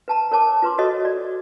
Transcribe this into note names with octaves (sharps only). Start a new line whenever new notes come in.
B4 A5 A#5
A#4 C#5 A5 D6
F4 B4 C6 D6
F#4 A4 C#5 D#5
D5